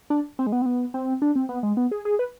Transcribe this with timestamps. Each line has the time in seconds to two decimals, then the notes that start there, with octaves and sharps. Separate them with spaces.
0.10 D4
0.39 C4
0.47 G#3
0.52 B3
0.62 C4
0.66 B3
0.94 C4
1.22 D4
1.36 C4
1.49 B3
1.63 G#3
1.77 B3
1.91 G#4
2.05 G#4
2.19 B4